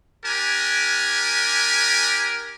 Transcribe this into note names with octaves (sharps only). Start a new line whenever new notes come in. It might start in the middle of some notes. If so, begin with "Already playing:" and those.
D4 G4 A#4 G#5